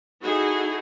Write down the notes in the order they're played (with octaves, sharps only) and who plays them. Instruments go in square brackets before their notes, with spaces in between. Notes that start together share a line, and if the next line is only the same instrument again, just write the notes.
[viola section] D#4 E4 F#4 G#4 A4